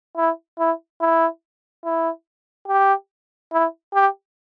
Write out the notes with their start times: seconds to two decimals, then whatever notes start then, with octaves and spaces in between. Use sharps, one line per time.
0.17 E4
0.59 E4
1.01 E4
1.85 E4
2.68 G4
3.53 E4
3.94 G4